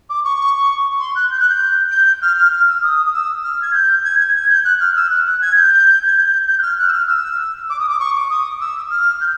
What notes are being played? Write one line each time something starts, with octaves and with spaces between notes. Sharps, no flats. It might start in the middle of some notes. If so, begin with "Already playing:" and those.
D6
C#6
C6
F#6
G6
F#6
G6
G6
F6
F6
F6
E6
D#6
D#6
E6
F6
G#6
G6
G#6
G#6
G#6
G6
F#6
F6
E6
F#6
F#6
G#6
G6
G#6
G6
G6
F#6
F6
F#6
E6
F6
E6
D6
D#6
D6
C#6
D6
D#6
E6
F6
G6